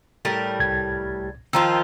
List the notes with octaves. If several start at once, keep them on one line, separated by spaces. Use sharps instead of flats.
A2 G3 A#4
C2 G#6
D#3 F3 F4 G5 A#5 E6